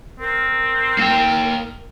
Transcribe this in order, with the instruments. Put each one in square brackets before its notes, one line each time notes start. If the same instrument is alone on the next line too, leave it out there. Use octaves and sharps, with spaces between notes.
[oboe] C4 [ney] A#4
[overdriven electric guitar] A#3 G5